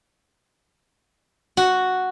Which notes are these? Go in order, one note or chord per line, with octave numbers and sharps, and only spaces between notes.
F#4